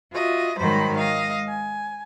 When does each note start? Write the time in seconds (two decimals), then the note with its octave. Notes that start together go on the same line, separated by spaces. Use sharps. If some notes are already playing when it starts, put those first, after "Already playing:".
0.13 F4 F#4 D#5 E5
0.58 G#2 D#3 F#3 G3 C5 B5
0.98 G#3 D#5 F5
1.47 G#5